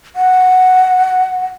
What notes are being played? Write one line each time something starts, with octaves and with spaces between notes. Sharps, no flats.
F#5